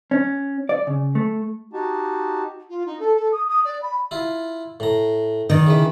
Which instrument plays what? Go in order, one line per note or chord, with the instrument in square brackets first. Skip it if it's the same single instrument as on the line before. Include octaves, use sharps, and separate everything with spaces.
[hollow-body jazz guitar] C#4
D5
C#3
A3
[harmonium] D#4 F#4 G4 A5
[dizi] F4
D#4
A4
A4
D#6
D#6
D5
B5
[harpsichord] E4 F4
A2 A#5
[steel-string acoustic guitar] D#3 [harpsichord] D#4 D5
[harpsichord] C#3 E3 B4